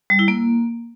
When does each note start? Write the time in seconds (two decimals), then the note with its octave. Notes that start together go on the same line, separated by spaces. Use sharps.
0.10 G3
0.19 E4
0.28 A#3